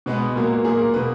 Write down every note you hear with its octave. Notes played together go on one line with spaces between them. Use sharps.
B2 G#3 B3 B4
A#2 F#3 A#3
A#2 A#3 G#4
A#4
B2 A#3 B4